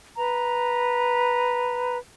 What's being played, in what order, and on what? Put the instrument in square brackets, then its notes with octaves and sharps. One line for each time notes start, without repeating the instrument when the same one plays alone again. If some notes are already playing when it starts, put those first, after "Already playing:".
[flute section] B4 A#5